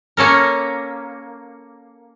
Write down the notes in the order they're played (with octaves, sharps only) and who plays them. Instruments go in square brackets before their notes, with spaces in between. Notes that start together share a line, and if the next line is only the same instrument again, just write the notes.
[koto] A#3 C#4 A4 A#4